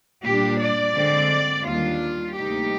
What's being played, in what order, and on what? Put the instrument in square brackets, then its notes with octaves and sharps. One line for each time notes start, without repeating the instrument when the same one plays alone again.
[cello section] A#2 G3 D4 G4
D5
D3 G#3 C4
D#2 D#3 G3 D4 F4
D2 C3 G3 A#3 D#4 G4